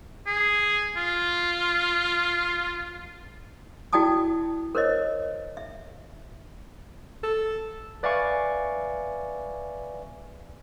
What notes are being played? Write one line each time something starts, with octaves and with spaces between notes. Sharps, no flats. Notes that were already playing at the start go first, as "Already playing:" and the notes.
G#4
F4
E4 F#4 D5 G5 A5 D#6
A#4 C5 C#5 D#5
E5
A4
B4 D5 E5 F5 G#5 C#6